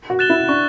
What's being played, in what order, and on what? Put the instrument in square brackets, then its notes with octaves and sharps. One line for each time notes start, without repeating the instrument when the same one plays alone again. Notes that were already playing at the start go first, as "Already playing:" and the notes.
[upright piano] F#4
[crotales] F#6 A6 E7 G7
[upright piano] E4
[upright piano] D4 [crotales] C#6